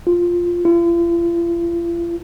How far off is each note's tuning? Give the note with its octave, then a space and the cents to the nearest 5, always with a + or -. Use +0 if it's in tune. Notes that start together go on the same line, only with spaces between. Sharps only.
F4 +0
F4 -45